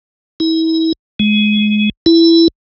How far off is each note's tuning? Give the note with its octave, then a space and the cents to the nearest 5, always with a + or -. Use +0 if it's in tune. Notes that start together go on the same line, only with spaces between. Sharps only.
E4 -35
G#3 +25
E4 +10